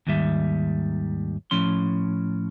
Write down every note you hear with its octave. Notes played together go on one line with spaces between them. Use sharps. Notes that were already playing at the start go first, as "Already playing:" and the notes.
D#2 G#2 D#3 G3 E5
A2 F3 C#4 C6